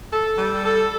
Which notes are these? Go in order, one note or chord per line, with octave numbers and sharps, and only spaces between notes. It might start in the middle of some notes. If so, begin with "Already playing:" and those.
A4
G3
A4